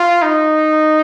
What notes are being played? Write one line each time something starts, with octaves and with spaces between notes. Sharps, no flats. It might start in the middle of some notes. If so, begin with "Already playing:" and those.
Already playing: F4
D#4